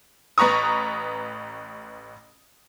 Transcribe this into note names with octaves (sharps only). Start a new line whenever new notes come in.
A1 B4 A#5 C#6 D#6